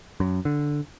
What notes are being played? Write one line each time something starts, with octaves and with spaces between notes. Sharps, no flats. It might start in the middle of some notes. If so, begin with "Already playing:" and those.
F#2
D3